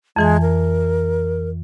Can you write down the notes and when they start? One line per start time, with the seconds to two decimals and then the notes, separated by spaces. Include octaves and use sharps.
0.16 F2 E3 G#3 G#5
0.42 A#4